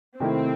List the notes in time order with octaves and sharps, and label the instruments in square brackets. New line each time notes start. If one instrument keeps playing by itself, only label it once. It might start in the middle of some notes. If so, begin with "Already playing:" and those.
[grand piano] C3 D#3 A3 E4 [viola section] C4